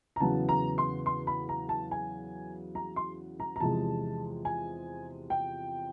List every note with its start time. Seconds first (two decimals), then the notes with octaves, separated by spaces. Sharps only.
0.16 A#5
0.20 E2 C#3 F#3 B3 A5
0.49 A#5
0.78 C6
1.06 C6
1.27 B5
1.49 A#5
1.69 A5
1.91 G#5
2.75 A#5
2.96 C6
3.40 A#5
3.56 A#5
3.60 E2 C3 F3 G#3 A5
4.45 G#5
5.30 G5